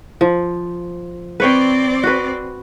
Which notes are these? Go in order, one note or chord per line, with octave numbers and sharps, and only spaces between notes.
F3
C4 B4 C#5 D5 G5
F#4 B4